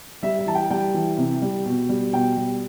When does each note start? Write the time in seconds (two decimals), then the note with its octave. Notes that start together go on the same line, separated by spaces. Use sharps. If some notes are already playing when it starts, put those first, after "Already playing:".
0.23 G3 E5
0.39 E5
0.46 E3 A5
0.55 G5
0.70 G3 G5
0.94 E3
1.18 C3
1.42 G3
1.66 B2
1.89 G3
2.13 B2 G5
2.37 G3